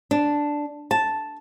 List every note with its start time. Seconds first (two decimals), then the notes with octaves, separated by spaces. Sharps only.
0.11 D4
0.91 A5